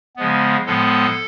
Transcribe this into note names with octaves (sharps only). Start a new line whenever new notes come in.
C#3 F3 G#3 B3
A2 F3 G#3 B3 A4